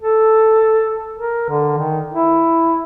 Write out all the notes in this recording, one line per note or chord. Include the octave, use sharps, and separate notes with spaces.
A4
A#4
D3
D#3
E4